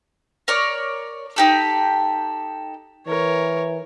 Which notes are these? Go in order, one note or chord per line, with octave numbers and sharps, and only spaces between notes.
A#4 C#5 D5
D#4 G4 A4
E3 A#4 C#5